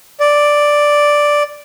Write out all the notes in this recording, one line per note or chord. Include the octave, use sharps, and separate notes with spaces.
D5